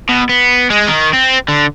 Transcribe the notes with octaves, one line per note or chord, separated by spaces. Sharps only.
B2
B3
G#3
D#3
C4
D3